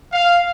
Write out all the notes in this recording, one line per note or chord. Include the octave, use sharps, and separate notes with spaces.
F5